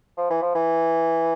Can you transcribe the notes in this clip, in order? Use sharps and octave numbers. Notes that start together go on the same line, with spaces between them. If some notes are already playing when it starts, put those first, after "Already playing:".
F3
E3
F3
E3